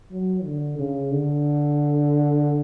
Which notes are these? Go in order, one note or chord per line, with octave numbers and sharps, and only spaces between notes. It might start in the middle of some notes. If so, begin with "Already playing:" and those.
F#3
D3
C#3
D3